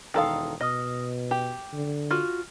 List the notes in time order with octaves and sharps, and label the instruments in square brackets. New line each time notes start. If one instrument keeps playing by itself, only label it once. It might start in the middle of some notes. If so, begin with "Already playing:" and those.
[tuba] E1 [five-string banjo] D#3 A4 F5 [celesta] A#5 C6 D#6
[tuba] B2 [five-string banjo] D#5 [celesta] D#6 F6 A#6
[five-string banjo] G4 [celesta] D6
[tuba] D3
[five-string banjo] F4 F#4 [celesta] F6